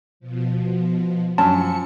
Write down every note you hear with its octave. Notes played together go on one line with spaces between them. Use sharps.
B2 F3
F#2 F3 A5 C#7